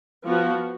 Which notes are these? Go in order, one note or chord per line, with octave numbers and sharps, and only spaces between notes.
F3 B3 F#4